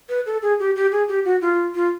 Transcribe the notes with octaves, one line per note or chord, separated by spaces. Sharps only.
B4
A4
G#4
G4
G4
G#4
G4
F#4
F4
F4